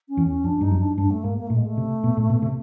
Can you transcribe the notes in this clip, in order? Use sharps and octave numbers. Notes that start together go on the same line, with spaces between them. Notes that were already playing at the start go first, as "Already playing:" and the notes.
C#4
E2
C#4
F2 D4
G2 D#4
F#2
D4
G2 D4
A3
G#2 A#3
A#3
A#2 A3
G#3
A3
C3
B2
A2
B2
C3